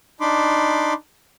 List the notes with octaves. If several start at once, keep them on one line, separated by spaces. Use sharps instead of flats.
D4 D#4 B5 C6 D6